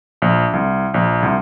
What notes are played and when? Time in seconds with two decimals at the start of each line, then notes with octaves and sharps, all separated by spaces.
0.22 A#1
0.53 C2
0.94 A#1
1.23 C2